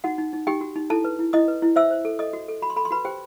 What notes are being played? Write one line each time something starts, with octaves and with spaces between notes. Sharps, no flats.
D#4 F#4 F#5
D#4
D#4
D#4 G4 G5
F#4
D#4
E4 A4 A5
B4
E4
E4 D#5 D#6
B4
E4
C5 E5 E6
C5
A4
A4 D#5 D#6
F#4
A4
F#4 B5
C6
A4 B5
C6
F#4 B4 B5
G4 C5 G5